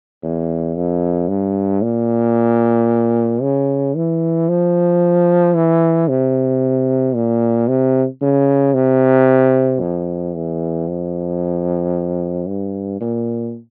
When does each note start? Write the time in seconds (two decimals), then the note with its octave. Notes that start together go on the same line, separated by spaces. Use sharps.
0.23 E2
0.76 F2
1.28 G2
1.82 A#2
3.42 C#3
3.96 E3
4.48 F3
5.55 E3
6.08 C3
7.15 A#2
7.68 C3
8.21 C#3
8.74 C3
9.81 F2
10.35 E2
10.88 F2
12.48 G2
13.01 A#2